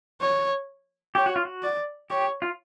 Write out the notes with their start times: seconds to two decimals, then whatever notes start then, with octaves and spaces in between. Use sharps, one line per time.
0.21 C#5
1.15 G4 C#5
1.26 F#4
1.36 F4
1.45 F#4
1.63 D5
2.10 G4 C#5
2.42 F4